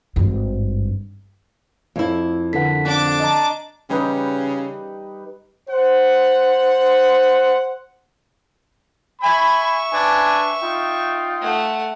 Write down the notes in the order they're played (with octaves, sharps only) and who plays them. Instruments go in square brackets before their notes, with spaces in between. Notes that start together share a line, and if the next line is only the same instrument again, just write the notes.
[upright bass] G#1 G2
[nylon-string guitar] F2 E4
[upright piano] D3 A#4 B4 [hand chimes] F#5 B6
[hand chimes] C4 [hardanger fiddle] D4 D6
[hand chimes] D#5 A5 A#5
[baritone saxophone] C#3 [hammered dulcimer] G3 D#4 B4
[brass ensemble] C5 F#5
[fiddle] E5 C#6 [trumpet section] G#5 B5
[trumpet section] D4 B4 G#5
D#4 F4 G5
[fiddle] A3 F#5